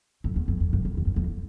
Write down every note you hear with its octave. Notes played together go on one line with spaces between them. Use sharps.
F2
E2
F2
F2
F#2
F2
E2
F#2
F2